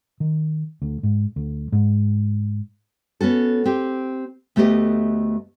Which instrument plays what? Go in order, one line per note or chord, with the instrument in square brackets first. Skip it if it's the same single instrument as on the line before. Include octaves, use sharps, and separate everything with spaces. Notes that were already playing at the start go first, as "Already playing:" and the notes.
[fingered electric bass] D#3
D2
G#2
D2
G#2
[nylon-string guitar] B3 C#4 F#4 A4
C4 G4
D2 A3 B3 G4 D#5